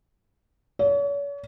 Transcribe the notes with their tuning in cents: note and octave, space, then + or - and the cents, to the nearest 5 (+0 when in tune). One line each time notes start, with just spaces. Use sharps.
C#5 +40